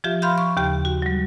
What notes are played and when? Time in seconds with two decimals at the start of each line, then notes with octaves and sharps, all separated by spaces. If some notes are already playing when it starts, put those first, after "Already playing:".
0.04 F3 F4 G4 E5
0.22 F5 B5 C6 F6 G6
0.38 C#6
0.57 D#2 C#3 G4 G5
0.85 F#4
1.02 F#3 G3